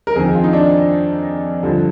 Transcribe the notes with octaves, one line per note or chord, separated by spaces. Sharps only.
A#4
F2 D#3 G#4
F4
D#4
D4
G2 D3 F3